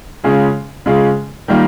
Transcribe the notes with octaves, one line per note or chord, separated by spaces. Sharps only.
C#3 G#3 C#4 F4 G#4
C#3 G#3 C#4 F4 G#4
D#3 G3 A#3 F4